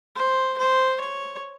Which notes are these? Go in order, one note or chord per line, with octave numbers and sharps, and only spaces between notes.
C5
C5
C#5